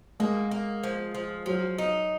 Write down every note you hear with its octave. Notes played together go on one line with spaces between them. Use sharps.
G#3 A#3
A#3
F3
F3
F3 F#3
D#4